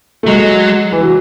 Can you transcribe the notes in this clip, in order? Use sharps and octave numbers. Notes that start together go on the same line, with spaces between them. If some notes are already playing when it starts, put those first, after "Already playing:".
A3
F#3 G#3
E3
F#3